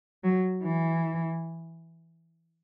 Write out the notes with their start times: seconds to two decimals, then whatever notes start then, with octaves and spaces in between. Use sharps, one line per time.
0.24 F#3
0.63 E3